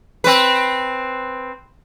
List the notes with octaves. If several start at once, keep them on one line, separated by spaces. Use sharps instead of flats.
C4 B4